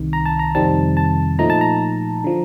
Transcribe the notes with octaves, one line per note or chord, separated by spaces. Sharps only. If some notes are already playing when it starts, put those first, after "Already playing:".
Already playing: C2 C3 D#3
A#5
A5
A#5
F2 C3 D#3 G3 C4 A5
A5
A#2 F3 A3 D#4 A#5
A5
A#5
D3 F3